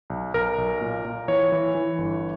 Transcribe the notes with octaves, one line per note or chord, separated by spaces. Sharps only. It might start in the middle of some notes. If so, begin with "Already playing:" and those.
B1
B1 A#4
B1
A#2
A#2
E3 C#5
E3
E3
G1